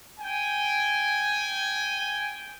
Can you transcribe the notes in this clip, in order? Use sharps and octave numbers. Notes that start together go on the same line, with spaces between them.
G5 G#5